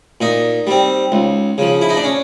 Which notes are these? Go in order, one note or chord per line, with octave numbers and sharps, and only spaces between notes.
A#2 D#4
G3 C4
C#2
C#3 F3
E4
D#4
D4
C#4